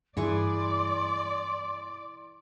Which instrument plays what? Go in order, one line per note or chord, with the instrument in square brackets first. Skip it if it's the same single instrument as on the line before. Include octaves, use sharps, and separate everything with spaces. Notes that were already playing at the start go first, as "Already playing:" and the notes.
[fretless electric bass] G2 [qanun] E3 G#4 C#6 [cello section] D5 [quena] C6